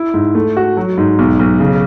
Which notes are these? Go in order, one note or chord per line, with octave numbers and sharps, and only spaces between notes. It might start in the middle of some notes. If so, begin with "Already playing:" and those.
Already playing: E4
G#2
A3
F#4
F#3
G#2
B1
B1
C#3